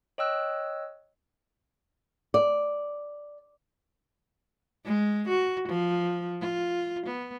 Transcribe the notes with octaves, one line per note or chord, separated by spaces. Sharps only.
C#5 D#5 G5 E6 F#6
D5
G#3
F#4
F3
F4
B3